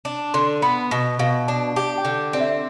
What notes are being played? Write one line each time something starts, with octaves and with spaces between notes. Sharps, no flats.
D4
D3 C6
B3 B5
B2
B2 F5
D4 A5
G4 A5
G5
D3
C4 D5
E5